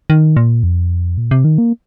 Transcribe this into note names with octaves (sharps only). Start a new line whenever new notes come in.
D#3
A#2
F2
A#2
C3
D#3
A#3